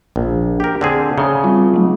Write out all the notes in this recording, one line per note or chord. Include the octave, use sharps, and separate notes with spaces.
A#1
G4 A#4
D3 C4 G#4
C#3 E5 A#5 D#6
G3 C4 F4
F#3 A3